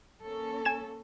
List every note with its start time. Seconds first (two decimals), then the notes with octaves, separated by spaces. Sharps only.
0.24 A#3 C#4 A4
0.65 G#5 G#6 E7